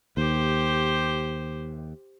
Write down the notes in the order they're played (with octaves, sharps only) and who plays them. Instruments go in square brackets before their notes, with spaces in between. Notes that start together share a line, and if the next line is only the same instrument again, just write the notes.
[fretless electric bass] D#2 [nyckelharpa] G4 C5